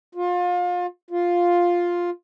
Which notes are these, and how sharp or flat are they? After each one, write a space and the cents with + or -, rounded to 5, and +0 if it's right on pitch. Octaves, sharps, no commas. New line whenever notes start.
F4 +30
F4 +5